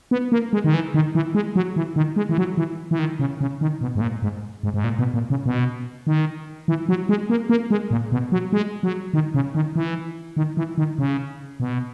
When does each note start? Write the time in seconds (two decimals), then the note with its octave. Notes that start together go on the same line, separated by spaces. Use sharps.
0.11 B3
0.32 A#3
0.53 G#3
0.64 D#3
0.74 E3
0.94 D#3
1.15 E3
1.35 G#3
1.56 F#3
1.76 E3
1.96 D#3
2.16 G#3
2.29 E3
2.38 F#3
2.57 E3
2.91 E3
2.99 D#3
3.19 C#3
3.41 C#3
3.61 D#3
3.81 B2
3.95 G#2
4.01 A#2
4.22 G#2
4.63 G#2
4.74 G#2
4.84 A#2
4.99 B2
5.14 A#2
5.30 C#3
5.46 B2
6.07 D#3
6.68 E3
6.89 F#3
7.09 G#3
7.30 A#3
7.50 A#3
7.71 G#3
7.91 A#2
8.12 B2
8.32 F#3
8.53 G#3
8.83 F#3
9.14 D#3
9.34 C#3
9.55 D#3
9.76 E3
10.37 D#3
10.57 E3
10.78 D#3
10.99 C#3
11.60 B2